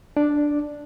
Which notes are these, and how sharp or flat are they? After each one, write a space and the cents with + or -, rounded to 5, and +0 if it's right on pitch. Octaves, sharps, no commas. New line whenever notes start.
D4 +0 D5 +0